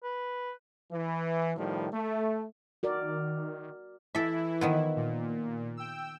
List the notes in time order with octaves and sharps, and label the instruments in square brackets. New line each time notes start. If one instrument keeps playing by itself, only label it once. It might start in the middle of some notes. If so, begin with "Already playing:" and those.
[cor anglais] B4
[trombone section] E3
A2 D#3 F3 G3
A3
[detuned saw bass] D#3 [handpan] F#4 A#4 D5
[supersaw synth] E3 E4 [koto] A4 E5
[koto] D#3 F3 B3
[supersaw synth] A#2
G5 E6